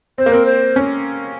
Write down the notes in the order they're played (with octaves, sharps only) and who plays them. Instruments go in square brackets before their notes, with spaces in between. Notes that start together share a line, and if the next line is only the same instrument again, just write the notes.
[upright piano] C4 [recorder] C5
[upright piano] A#3
[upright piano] C4 [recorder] A#4
[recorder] C5
[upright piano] C#4